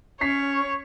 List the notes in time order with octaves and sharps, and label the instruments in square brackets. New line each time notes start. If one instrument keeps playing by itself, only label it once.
[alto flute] C#4 [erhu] C#5 [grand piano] C#6 B6 C7